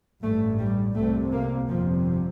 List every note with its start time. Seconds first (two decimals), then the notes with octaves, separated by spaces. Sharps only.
0.23 A1 G2 A3
0.58 G3
0.95 C2 C3 A3
1.32 A#3
1.68 G1 F2 C3 F3